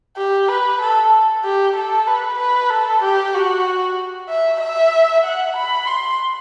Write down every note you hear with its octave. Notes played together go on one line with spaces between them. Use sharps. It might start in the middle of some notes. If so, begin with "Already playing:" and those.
G4
B4
A4
G4
A4
B4
B4
A4
G4
F#4
E5
E5
F#5
B5
C6